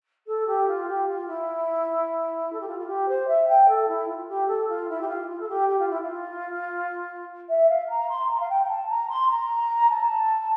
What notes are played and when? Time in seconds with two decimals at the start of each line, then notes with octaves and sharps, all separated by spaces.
0.26 A4
0.46 G4
0.67 F4
0.87 G4
1.07 F4
1.26 E4
2.52 A4
2.60 G4
2.67 F4
2.78 F4
2.87 G4
3.08 C5
3.27 E5
3.47 G5
3.68 A4
3.87 E4
4.08 F4
4.27 G4
4.47 A4
4.68 F4
4.88 E4
5.00 G4
5.07 F4
5.28 F4
5.39 A4
5.48 G4
5.68 G4
5.78 F4
5.89 E4
6.01 F4
7.48 E5
7.69 F5
7.89 A#5
8.09 C6
8.28 A#5
8.39 F5
8.49 G5
8.62 G5
8.68 A5
8.89 A#5
9.09 C6
9.29 A#5
9.89 A5